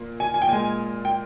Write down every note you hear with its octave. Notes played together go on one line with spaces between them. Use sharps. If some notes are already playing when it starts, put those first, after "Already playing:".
Already playing: A#2 A#3
G#5
G#5
G5
A#2 G#3 G#5
G5